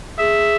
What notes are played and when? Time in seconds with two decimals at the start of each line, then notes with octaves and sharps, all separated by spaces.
0.18 G#4 E5